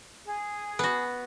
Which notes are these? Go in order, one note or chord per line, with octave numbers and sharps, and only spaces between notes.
G#4
B3 F#4